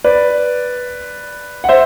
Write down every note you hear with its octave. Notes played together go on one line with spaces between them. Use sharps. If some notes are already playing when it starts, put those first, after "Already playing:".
B4 D5
F#5
C5 E5